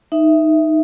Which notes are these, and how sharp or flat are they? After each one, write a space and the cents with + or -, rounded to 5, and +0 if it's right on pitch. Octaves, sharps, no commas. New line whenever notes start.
D#4 +0 E5 +0